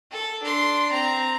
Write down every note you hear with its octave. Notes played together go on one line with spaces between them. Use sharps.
A4
D4 C6
C4 A#5